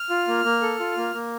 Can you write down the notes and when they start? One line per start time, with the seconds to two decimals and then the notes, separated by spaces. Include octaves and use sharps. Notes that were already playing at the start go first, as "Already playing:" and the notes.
Already playing: F6
0.10 F4
0.28 A#3
0.44 A#3
0.62 A4
0.80 F4
0.97 A#3
1.14 A#3